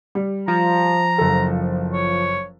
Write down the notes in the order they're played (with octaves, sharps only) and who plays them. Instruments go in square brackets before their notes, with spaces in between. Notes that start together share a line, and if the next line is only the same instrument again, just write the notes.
[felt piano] G3
[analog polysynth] F3 [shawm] A#5
[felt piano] F#1 A4
[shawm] C#5